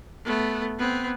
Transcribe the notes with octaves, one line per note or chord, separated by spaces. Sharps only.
A3 B3
B3 C4